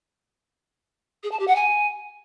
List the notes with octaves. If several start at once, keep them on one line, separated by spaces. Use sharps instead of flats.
G#4
A5
G4
F#5
G#5